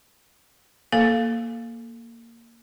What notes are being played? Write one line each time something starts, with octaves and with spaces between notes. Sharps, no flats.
A#3 A4 F5